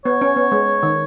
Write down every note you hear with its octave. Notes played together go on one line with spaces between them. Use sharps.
B3 C#5
C#4
B3
G#3
D#3